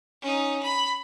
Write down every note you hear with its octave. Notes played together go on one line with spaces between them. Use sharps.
C#4 D#4
B5